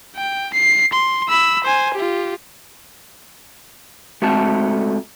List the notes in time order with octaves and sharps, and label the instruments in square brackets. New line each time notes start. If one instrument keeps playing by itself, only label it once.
[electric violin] G5
C7
C6
B5 E6
C5 G#5
F4 G4
[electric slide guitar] G#3 A3 C4 F#4 A4 A5